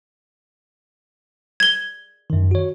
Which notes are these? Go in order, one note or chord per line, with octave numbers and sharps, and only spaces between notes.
G#6 G7
F#2 D#3
F#4 C#5